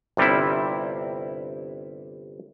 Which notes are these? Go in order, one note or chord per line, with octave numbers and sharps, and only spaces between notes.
G1 C3 G3 C4 E4